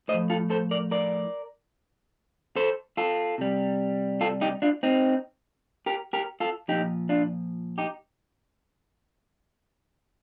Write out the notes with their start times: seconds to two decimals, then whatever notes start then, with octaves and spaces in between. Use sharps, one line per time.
0.08 A2 C5 D#5
0.14 F3
0.30 F4 A4
0.50 A4 C5
0.71 A#4 D5
0.91 A#4 D5
2.56 A4 C5
2.97 F4 A4
3.38 C3 G3
4.21 F4 A4
4.41 D#4 G4
4.62 D4 F4
4.83 C4 D#4
5.86 G4 A#4
6.13 G4 A#4
6.40 F4 A4
6.68 A#2 F3 D#4 G4
7.09 D4 F4
7.78 D#4 G4